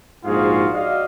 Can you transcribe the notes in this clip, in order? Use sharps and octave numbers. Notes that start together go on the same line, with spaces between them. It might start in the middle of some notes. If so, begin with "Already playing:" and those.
A#1 G#2 F4 F#4 G#4 F5
F#4 D5 D#5 F5